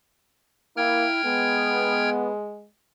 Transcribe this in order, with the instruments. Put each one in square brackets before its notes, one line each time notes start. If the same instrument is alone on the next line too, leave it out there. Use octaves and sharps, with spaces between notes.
[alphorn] A#3 [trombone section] E4 [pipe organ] G5 F6 G#6
[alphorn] G#3 [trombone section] B3